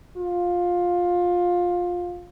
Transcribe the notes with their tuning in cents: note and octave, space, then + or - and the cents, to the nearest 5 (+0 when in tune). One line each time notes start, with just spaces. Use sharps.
F4 +15